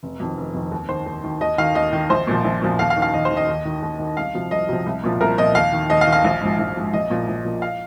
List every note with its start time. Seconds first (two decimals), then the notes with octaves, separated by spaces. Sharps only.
0.03 F1
0.20 F2 D#3
0.37 F1
0.54 F2 D#3
0.72 D#2
0.89 D#3 C5
1.06 D#2
1.24 D#3
1.41 D#2 D#5
1.58 D#3 F5
1.75 D#2 D#5
1.93 D#3
2.10 A#1 C5
2.27 A#2 F3
2.45 A#1
2.62 A#2 F3
2.79 D#2 F5
2.90 F5
2.96 D#3
3.02 F5
3.13 D#2 D#5
3.25 C5
3.31 D#3
3.37 D#5
3.48 D#2
3.65 D#3
3.82 D#2
3.99 D#3
4.17 C2 F5
4.34 C3 F3
4.51 C2 D#5
4.69 C3 F3
4.86 C2
5.04 A#2 F3
5.21 C2 A#4
5.38 A#2 F3 D#5
5.55 D#2 F5
5.73 D#3
5.90 D#2 D#5
6.01 F5
6.07 D#3
6.13 F5
6.24 A#1
6.41 G#2 F3
6.59 A#1
6.76 G#2 F3
6.93 A#1 D#5
7.10 A#2 F3
7.28 A#1
7.45 A#2 F3
7.62 F5